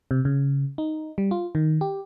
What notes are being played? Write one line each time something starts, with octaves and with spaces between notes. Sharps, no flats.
C3
C#3
D#4
G3
F4
D#3
G4